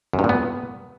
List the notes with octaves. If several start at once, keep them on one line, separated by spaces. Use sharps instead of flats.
F#2
G2
A#2
B3